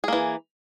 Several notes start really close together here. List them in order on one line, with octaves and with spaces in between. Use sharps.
G#4 A#3 E3